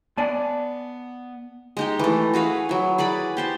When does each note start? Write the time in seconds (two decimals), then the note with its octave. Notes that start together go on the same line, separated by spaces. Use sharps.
0.18 B3 D5 G#5 A5
1.77 G#3 D#4 G4
1.99 E3 A3
2.34 F#4 G#4 B4 F5
2.69 F#3 E4
2.98 G#4 B4 D5 B5
3.37 G4 C5 A5